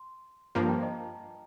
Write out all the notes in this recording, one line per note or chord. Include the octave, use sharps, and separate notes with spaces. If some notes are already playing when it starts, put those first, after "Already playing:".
Already playing: C6
G2 F3 A#3 A#5
A5
G5
D#5